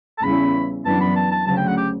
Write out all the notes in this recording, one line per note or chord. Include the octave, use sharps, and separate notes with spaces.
A5
E2 C#3 G3 C#4 E4 B5
F#2 E3 B3 D4 A5
B5
A5
A5
D2 C#3 F#3 A5
G5
F#5
G4